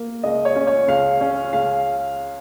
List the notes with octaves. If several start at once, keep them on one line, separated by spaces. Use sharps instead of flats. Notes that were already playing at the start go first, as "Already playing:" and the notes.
Already playing: A#3
C#2 D#5
C#5
C#4
C#5
C#2 F5
C#4
C#2 F5